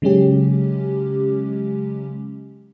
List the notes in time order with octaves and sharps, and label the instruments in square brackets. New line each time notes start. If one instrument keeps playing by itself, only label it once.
[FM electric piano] C#3 F#3 G#3 C#4 G4